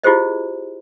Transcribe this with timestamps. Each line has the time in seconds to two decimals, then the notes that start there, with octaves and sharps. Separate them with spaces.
0.04 E4 F4 G4 G#4 C5 D#5